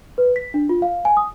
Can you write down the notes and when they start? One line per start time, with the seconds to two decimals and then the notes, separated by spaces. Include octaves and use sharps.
0.18 B4
0.36 B6
0.54 D4
0.69 F4
0.82 F5
1.05 G#5
1.17 D#6